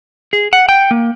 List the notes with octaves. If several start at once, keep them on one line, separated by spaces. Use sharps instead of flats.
G#4
F#5
G5
A#3